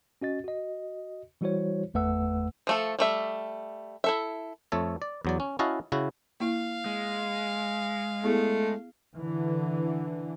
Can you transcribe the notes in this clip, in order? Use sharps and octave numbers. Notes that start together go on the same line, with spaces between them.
C#4 F#4 D#5 A6
F#4 D#5
E3 G3 E4 F#4 C5 C#5
G1 E2 A3 B4 F#5 E6
F3 A3 A4
G3 A3 E5
E4 A4 E5
F2 A3 A4 C#5
D5
E2 F#3 D5
C#4
C#4 E4 F#4 D#5 F5 A5
C#3 E4 F#4
A#3 E4 F5
G#3
A3 B3 E4 G#4
D3 E3